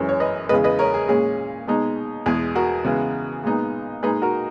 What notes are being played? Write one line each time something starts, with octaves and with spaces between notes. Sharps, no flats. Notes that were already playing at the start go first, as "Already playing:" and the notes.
Already playing: F#2 E3 G#3 C#4
C#5
B4 D#5
E2 C#3 G#3 B4 D#5
B4 D#5
A#4 C#5
G#4
A#2 G#3 C#4 G#4
B2 G#3 D#4
E2 B2 G#3 G#4
F#4 A#4
C#3 E3 G#3 B3
A#2 G#3 B3 D#4
A#2 G#3 D#4 G#4 B4
F#4 A#4